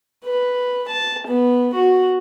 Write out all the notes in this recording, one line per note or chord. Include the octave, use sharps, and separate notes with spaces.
B4
A5
B3
F#4